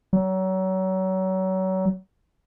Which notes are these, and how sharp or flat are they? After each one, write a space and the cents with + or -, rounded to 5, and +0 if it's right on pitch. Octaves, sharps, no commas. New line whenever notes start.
F#3 +30